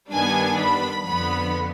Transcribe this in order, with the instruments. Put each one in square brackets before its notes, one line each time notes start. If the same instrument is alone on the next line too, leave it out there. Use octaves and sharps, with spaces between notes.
[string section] G2 D#3 G3 B3 D4 G#5
B5
F2 D3 F3 B3 B5